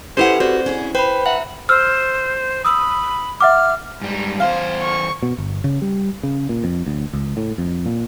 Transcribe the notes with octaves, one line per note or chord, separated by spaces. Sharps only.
C#4 E4 G4 A4 B4 C5 F#5
C4 F#4 C5 D5
C#4 E4 G#4
B4 C5 G5 B5
E5 F#5 A#5
C5 E6 F6
B5 D#6 E6
E5 F#5 D6 F6
G#2 G3
E2 C5 F5
C#6
B2
G1
C#3
G3
C#3
A#2
F2
D2
C#2
A2
F2
A#2